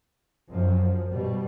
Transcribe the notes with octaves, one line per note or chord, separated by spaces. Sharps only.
F#2 F3
B2 G3